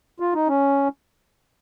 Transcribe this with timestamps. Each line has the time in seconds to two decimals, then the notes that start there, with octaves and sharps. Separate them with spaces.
0.20 F4
0.34 D#4
0.48 C#4